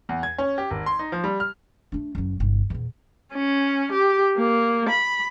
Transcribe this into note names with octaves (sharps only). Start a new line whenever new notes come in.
E2
G#6
C#4
G4
G#1
C6
D#4
F3
G3
F6
A3 D4
F#1 F#3
G1 C2
E2 A#2
C#4
G4
A#3
B5